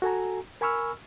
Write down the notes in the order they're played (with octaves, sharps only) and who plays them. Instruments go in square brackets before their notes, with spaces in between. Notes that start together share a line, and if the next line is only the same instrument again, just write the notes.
[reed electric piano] F#4 A4 G#5 A#5
A#4 G#5 B5 C#6 E6 F6